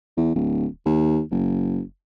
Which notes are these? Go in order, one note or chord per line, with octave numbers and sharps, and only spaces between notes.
E2
D1
D#2
F#1